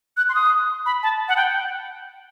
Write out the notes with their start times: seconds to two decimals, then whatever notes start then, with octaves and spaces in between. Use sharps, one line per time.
0.17 F#6
0.29 C6
0.35 D#6
0.86 B5
1.03 A5
1.28 F#5
1.37 G5